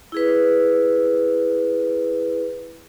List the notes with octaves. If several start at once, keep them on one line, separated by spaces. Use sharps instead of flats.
E4 G#4 B4